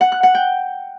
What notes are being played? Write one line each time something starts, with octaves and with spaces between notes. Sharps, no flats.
F#5
F#6
F#5
G5